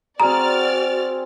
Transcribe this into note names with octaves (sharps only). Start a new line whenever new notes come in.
C4 F#4 G#4 D5 A#5 F6 A6